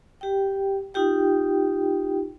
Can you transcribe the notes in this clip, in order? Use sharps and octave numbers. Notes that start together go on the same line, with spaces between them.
G4 G5
D#4 F4 G4 G5